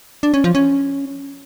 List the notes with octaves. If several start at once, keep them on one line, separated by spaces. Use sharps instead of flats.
D4
C#4
F3
C#4